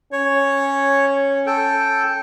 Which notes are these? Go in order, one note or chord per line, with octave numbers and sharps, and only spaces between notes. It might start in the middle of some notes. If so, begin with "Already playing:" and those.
C#4 C#5
A4 G5